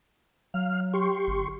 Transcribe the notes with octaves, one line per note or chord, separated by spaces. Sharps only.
F#3 F5 F6
G4 C6 C#6
G1